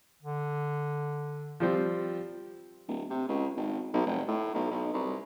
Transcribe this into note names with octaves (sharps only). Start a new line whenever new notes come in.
D3
F3 G3 C4
D1
C3
C#2
G#1
B1
F1
A2
B1
B1
C2